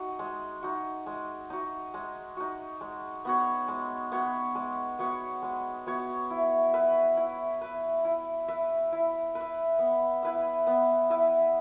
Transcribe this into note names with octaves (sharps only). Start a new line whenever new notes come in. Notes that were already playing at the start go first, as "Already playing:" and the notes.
Already playing: D#4 F#4
G#3
D#4 F#4
G#3
D#4 F#4
G#3
D#4 F#4
G#3
B3 F#4 C#5
G#3
B3 F#4 C#5
G#3
B3 F#4 C#5
G#3
B3 F#4 C#5
E4
B4 E5
E4
B4 E5
E4
B4 E5
E4
B4
E5
B3
E4 B4 E5
B3
E4 B4 E5